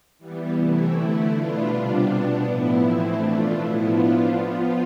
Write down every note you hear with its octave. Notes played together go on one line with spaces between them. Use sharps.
E3 G3 B3
C3 E3 A3 E4
D3 A3 E4
B2 B3 D4 F4
C3 G3 D4 F4
B2 B3 D4
A2 F3 B3 E4
E3 A3 C4 E4
B2 A3 D4 F4
A2 F3 B3 E4
F3 B3 D4 F4
F3 B3 F4